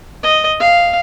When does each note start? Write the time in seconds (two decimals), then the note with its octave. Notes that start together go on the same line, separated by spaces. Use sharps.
0.23 D#5
0.60 F5